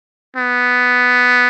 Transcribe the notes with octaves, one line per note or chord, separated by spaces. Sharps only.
B3